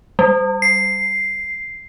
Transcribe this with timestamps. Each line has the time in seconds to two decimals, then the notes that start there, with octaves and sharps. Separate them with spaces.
0.19 G3
0.62 C7